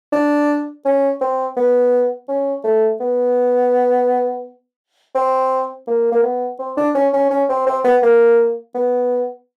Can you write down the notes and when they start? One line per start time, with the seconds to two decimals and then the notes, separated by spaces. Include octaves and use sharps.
0.13 D4
0.85 C#4
1.21 C4
1.56 B3
2.29 C#4
2.64 A3
3.00 B3
5.15 C4
5.87 A#3
6.12 A#3
6.23 B3
6.59 C4
6.77 D4
6.95 C#4
7.13 C#4
7.30 C#4
7.49 C4
7.67 C4
7.84 B3
8.02 A#3
8.75 B3